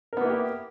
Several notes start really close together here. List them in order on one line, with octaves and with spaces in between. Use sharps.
A#4 B3 A#3 E4 G4